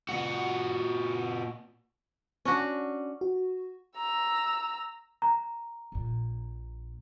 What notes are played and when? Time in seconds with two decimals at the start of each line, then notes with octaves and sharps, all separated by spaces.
0.09 A#2 F#4
2.45 C#4 D4 F#4
3.21 F#4
3.97 A#5 E6
5.22 A#5
5.92 A#1 A#2